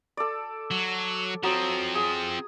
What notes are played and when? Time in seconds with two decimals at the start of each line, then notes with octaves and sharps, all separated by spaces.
0.17 A4 D5
0.71 F#3
1.43 F3 F#3 C4 D#6
1.95 G#4